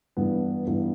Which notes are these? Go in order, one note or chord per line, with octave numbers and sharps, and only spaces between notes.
G2 E3 B3
G2 E3 B3